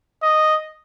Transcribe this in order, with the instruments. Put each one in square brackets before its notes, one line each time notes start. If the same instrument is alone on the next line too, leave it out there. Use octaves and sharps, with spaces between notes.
[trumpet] D#5